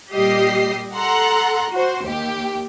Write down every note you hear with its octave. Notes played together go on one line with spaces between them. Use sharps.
A#2 G3 G4 D#5 C7
A4 F#5 A#5 C6 F#6
F#4 C5
D#2 G4